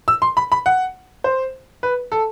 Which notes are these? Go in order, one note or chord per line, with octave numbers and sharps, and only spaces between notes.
E6
C6
B5
B5
F#5
C5
B4
A4